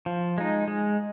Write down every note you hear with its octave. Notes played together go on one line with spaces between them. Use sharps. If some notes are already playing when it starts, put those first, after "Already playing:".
F3
G#3 D#4
G#3